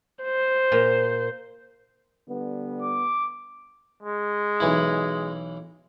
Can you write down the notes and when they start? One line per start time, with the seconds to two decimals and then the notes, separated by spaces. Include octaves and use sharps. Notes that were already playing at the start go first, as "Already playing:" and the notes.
0.24 C5
0.72 A#2
2.29 D3 G3 B3
2.82 D6
4.03 G#3
4.60 B1 E3 E4